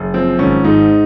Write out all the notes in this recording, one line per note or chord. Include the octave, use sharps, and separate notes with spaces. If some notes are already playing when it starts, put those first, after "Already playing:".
Already playing: F#1
F3 C4
G#1 C#4
G#2 D#4